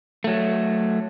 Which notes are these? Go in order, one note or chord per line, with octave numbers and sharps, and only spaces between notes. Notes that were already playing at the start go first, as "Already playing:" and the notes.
F#3 A3